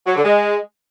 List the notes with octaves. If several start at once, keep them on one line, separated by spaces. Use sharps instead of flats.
F#3
D3
G#3